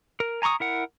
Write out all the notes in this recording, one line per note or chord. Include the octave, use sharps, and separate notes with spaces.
A#4
G#5 A#5 C6 C#6 D#6
E4 A#4 F#5